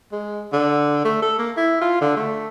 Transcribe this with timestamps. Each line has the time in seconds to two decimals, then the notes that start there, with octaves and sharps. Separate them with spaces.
0.12 G#3
0.53 D3
1.05 A3
1.22 A4
1.39 A#3
1.57 E4
1.81 F4
2.01 D3
2.17 A3